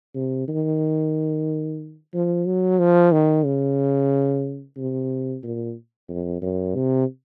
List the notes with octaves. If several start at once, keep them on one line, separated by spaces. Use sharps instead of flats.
C3
D#3
F3
F#3
F3
D#3
C#3
C3
A#2
F2
F#2
C3